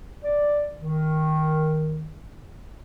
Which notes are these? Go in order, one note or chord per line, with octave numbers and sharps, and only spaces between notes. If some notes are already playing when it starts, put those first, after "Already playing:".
D5
D#3